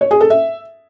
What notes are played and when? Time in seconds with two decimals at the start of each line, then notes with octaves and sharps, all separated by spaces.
0.01 C#5
0.11 G#4
0.21 A4
0.30 E5